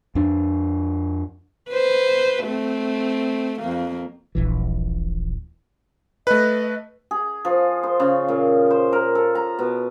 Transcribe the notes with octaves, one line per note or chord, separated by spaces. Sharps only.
F2 D4
B4 C5
A3 C4
F2 A#3
D#1 A#1 E3
A3 B4 D#5
G#4
F3
C5
C#3
A#2
C5
A#4
A4
A#5
B2